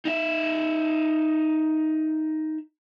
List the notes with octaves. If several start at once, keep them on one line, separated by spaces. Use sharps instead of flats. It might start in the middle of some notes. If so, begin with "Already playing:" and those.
D#4 E5